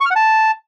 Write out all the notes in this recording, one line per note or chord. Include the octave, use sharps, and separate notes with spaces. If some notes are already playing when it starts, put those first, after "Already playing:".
C#6
F6
F#5
A5